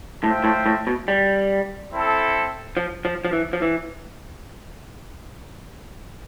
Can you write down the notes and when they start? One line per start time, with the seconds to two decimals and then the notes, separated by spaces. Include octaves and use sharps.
0.22 A2 F4 C5 E5 G5
0.44 A2
0.66 A2
0.87 B2
1.08 G3
1.92 C4 E4 A4
2.77 F3
3.05 F3
3.25 F3
3.33 E3
3.53 F3
3.62 E3